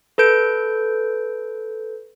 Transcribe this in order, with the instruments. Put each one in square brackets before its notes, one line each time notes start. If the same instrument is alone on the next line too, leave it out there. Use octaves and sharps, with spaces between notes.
[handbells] A4 B4 G6 D7